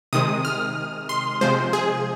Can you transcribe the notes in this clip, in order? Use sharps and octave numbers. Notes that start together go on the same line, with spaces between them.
C3 D#3 G#3 D#6
F6
C6
C3 F3 G#3 C5
G#4